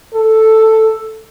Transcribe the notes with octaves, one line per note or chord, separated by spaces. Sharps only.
A4